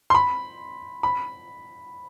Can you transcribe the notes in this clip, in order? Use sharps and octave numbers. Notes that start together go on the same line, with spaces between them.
C6
B5
B5